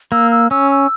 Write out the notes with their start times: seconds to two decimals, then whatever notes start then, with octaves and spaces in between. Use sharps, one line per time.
0.12 A#3 E6
0.31 E6
0.51 C#4 E6
0.71 E6